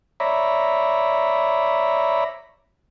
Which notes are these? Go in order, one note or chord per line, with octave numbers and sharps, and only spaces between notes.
C#5 D5 E5 A#5 B5